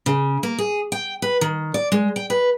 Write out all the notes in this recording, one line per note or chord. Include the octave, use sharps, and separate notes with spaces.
C#3
A#3
G#4
G5
B4
D#3
D5
G#3
G5
B4